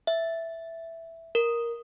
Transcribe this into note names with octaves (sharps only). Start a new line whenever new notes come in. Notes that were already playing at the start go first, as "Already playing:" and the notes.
E5
A#4